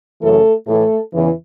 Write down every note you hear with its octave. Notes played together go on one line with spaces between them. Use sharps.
F#2 C#3 E3 A3 A4
A2 E3 A3 A4
E2 C#3 E3